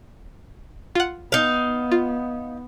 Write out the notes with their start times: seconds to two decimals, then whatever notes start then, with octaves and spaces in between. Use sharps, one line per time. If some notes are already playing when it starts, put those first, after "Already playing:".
0.95 F4 F#5
1.32 B3 D#4 F5
1.92 F4